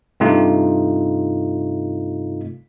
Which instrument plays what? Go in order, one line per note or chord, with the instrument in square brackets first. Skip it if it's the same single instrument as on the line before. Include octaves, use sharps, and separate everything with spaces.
[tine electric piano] G2 C3 A3 D#4 F4